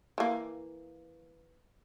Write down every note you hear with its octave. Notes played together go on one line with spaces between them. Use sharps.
E3 A#3